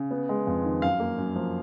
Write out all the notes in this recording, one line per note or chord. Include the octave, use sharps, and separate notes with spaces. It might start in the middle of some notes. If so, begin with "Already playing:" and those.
Already playing: C#3
B3
G#3
F2
D#3
F#2 F5
A#3
F#2
F3